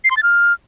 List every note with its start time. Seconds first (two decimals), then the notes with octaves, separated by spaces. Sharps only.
0.04 C7
0.11 C6
0.17 A6
0.23 F6